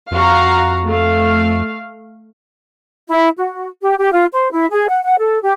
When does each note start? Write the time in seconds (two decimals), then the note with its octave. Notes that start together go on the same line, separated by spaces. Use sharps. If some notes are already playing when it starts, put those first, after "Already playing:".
0.11 F2 F#4 F5 A#5
0.86 A3 F5
3.09 E4
3.38 F#4
3.81 G4
3.99 G4
4.12 F4
4.32 C5
4.51 E4
4.71 G#4
4.89 F#5
5.03 F#5
5.18 A4
5.42 G4